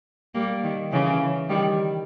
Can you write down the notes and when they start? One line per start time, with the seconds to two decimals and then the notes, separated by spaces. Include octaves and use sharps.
0.35 G3 A#3
0.63 D#3
0.92 C#3 E3
1.49 D#3 G3